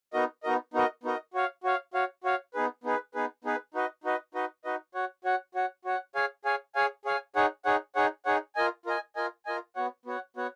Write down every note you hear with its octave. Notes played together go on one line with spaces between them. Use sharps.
B3 D#4 F#4 A#4 D#5
B3 D#4 F#4 A#4 D#5
B3 D#4 F#4 A#4 D#5
B3 D#4 F#4 A#4 D#5
F#4 C#5 F5
F#4 C#5 F5
F#4 C#5 F5
F#4 C#5 F5
B3 D#4 G#4 B4
B3 D#4 G#4 B4
B3 D#4 G#4 B4
B3 D#4 G#4 B4
D#4 F#4 B4 D#5
D#4 F#4 B4 D#5
D#4 F#4 B4 D#5
D#4 F#4 B4 D#5
F#4 C#5 F#5
F#4 C#5 F#5
F#4 C#5 F#5
F#4 C#5 F#5
G#4 C#5 F5 G#5
G#4 C#5 F5 G#5
G#4 C#5 F5 G#5
G#4 C#5 F5 G#5
D#4 G#4 C#5 F#5
D#4 G#4 C#5 F#5
D#4 G#4 C#5 F#5
D#4 G#4 C#5 F#5
F4 A#4 D#5 G#5
F4 A#4 D#5 G#5
F4 A#4 D#5 G#5
F4 A#4 D#5 G#5
B3 F#4 C#5 F#5
B3 F#4 C#5 F#5
B3 F#4 C#5 F#5